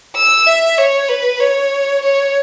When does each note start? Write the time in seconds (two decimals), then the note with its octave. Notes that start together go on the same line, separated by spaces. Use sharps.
0.17 E6
0.47 E5
0.78 C#5
1.09 B4
1.40 C#5
2.02 C#5